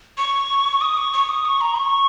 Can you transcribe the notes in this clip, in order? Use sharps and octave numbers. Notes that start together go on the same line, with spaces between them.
C#6
D#6
C#6
C#6
D#6
C#6
A#5
C#6